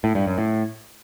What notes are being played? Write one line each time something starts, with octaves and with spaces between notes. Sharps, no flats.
A2
G2
F#2
A2